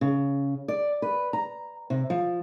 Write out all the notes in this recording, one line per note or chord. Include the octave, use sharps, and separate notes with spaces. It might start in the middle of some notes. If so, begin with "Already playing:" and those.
C#3
D5
B4
A#5
C3
F3